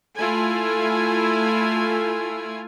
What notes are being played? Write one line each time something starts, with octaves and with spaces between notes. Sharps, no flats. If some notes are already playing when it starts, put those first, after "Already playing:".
A3 E4 F4 A4 G#5